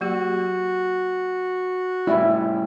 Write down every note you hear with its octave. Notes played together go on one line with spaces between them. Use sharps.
F#3 A#3 F#4 G4
A2 G3 E4